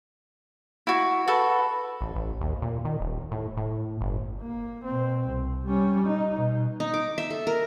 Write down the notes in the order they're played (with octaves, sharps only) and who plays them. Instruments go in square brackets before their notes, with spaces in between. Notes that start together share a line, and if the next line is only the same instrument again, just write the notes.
[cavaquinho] E4 F#4
[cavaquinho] F#4 A4 [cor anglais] B4
[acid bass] A1
A1
D#2
A#2
D#3
D#1
A2
A2
G1
[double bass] A#3
B2 C4
C2
G3 C#4
D#4
B2
[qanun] D#4
D6
E5
A4
A#4